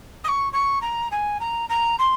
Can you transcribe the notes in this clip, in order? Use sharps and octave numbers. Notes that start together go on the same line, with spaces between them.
D#6
C#6
C#6
A#5
G#5
A#5
A#5
C6